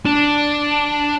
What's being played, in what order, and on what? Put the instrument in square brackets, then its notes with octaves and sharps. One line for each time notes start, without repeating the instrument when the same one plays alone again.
[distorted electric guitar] D4